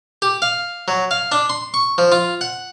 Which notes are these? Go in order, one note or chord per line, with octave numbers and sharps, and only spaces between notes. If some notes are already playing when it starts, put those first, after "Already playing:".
G4
F5
F#3
F5
D4
C6
C#6
F3
F4
F#5